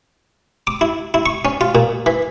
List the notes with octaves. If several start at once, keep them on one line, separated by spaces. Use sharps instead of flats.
D6
E4
E4
C#6
C#4
F4
A#2
E3